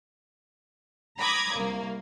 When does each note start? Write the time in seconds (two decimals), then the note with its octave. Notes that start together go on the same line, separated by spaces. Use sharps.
1.19 A#5 B5 D6 D#6 G#6
1.55 C2 A#3